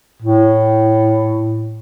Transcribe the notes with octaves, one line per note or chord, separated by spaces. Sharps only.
A2